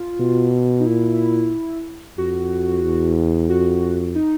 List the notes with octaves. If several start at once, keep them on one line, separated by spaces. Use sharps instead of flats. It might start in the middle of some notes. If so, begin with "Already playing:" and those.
Already playing: F4
B2
D#4
A#2 E4
F2 F#4
E2
F2 F#4
D#4